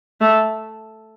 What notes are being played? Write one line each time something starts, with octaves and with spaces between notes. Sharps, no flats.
A3